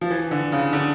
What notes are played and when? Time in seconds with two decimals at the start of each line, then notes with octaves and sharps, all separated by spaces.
0.01 F3
0.11 E3
0.31 D3
0.52 C#3
0.73 D3